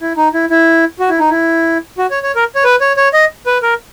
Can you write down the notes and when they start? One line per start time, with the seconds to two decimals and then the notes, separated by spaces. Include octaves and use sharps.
0.01 E4
0.17 D#4
0.34 E4
0.50 E4
1.00 F#4
1.09 E4
1.20 D#4
1.30 E4
1.98 F#4
2.11 C#5
2.23 C#5
2.36 A#4
2.55 C#5
2.64 B4
2.81 C#5
2.97 C#5
3.14 D#5
3.46 B4
3.63 A#4